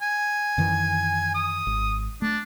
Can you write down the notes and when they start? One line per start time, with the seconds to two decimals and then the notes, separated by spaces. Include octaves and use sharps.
0.02 G#5
0.58 F#2 D#3 E3
1.34 D#6
1.67 G#1
2.22 A3 D4